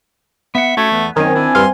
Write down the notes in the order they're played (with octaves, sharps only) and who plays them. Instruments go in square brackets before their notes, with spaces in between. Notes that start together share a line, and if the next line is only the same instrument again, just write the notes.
[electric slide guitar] B3 F#5 [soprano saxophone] E5
[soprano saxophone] A3 [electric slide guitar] C#4 F#4 C#5
[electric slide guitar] E2 B3
[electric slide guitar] F#2 A#3 D#5 [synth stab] D#3 [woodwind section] C4 G#5 [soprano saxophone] C#4
[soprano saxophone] D4 [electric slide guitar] E4
[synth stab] G2 F5 [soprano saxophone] C6